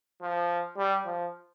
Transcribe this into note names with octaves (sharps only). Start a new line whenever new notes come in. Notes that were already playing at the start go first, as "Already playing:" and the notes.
F3
G3
F3